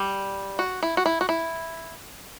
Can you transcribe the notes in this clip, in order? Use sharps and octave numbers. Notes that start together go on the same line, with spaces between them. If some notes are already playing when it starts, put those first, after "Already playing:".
Already playing: G3
F#4
E4
F#4
E4
F#4
E4